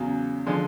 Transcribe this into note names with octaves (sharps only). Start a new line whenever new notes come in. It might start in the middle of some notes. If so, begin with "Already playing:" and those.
Already playing: E2 C#3 F#3
D3 F3 G#3